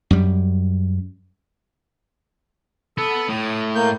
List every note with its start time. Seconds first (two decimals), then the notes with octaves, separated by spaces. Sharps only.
0.11 F#2 G3
2.98 B3 A4
3.29 A2 D#6
3.75 A#3 G6